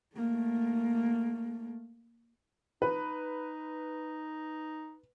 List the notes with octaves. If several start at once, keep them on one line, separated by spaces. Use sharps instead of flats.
A3 A#3
D#4 B4